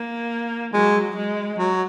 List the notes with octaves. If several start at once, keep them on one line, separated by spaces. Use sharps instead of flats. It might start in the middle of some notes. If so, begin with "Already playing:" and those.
Already playing: A#3
F#3 G#3
G#3
F#3